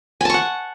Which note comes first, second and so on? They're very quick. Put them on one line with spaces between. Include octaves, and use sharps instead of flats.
G#5 A5 C#6 F#5